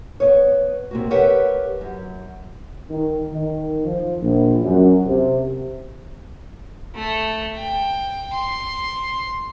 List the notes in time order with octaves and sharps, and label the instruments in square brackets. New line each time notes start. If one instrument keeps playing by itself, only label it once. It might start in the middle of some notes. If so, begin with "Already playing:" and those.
[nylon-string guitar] B3 C#5
C3 A#3 F#4
G4 A#4 B4 C#5 E5 F#5
F#2
[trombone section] D#3
D#3
F3
A#1
F#2
C3
[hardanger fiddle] A3
G5
C6